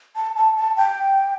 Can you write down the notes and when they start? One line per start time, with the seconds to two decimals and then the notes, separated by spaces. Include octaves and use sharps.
0.16 A5
0.36 A5
0.56 A5
0.76 G5